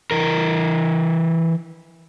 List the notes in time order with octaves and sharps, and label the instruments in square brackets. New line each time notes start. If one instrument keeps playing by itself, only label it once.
[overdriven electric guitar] E3 A#4